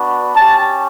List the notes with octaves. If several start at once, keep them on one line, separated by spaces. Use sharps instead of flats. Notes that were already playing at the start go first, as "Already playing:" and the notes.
Already playing: B3 D4 F#4
C#4 G4 A5